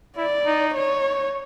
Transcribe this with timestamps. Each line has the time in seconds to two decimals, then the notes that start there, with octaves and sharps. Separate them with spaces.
0.17 E4 D5
0.46 D#4
0.75 C#5